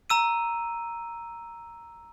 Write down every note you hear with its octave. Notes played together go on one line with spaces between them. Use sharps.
A#5 E6 D#7